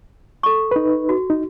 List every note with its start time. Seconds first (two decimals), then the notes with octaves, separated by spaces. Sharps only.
0.43 A4 C#6
0.71 D#4 B4
1.09 F#4
1.30 D#4